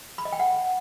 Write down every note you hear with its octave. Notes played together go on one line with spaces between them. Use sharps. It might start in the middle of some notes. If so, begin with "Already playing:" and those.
B5
D#5
G5
F#5